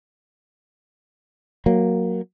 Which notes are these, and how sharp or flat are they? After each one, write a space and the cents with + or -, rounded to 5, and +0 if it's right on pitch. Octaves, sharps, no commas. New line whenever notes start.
F#3 -10 A#3 +0